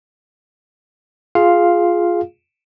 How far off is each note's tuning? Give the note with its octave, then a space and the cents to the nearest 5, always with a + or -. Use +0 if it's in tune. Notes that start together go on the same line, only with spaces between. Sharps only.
F4 +0 G#4 +0 F5 +0